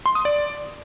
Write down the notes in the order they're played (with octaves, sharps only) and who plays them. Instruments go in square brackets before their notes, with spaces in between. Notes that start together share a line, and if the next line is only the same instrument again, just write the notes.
[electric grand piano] C6
D#6
D5